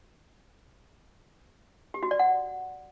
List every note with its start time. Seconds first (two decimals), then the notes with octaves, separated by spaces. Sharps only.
1.94 G4
2.03 F#4
2.11 D5
2.19 F#5